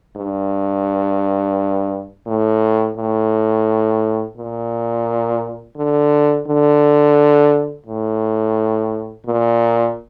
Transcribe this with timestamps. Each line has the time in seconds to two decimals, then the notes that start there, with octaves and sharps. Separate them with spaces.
0.16 G2
2.27 A2
2.97 A2
4.37 A#2
5.76 D3
6.47 D3
7.86 A2
9.26 A#2